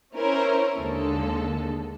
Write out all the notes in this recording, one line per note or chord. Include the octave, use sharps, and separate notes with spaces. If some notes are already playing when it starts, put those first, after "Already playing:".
C#4 E4 A#4 C5 C#5
D#2 D3 G#3 A4